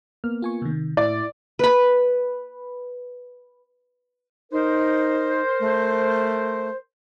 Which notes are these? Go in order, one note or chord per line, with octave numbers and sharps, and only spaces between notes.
A#3 B3 F6
F4 G#5 C#6
C3 D#3
A2 E4 D5
B4 B5
D#4 A#4 C5
A3